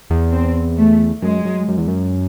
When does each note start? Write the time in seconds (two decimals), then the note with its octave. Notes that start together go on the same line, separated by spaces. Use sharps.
0.10 E2
0.32 C4
0.78 A3
1.22 F#2 G#3
1.45 F#2
1.68 F#2
1.78 E2
1.88 F#2